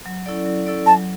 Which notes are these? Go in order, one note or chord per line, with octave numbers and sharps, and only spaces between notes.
F#3
C#4 E4 A4 D5
F#3
C#4 E4 A4 D5
F#3 A5